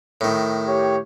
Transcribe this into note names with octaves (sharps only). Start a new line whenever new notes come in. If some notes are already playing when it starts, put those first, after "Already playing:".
A2 D#3
G4 C#5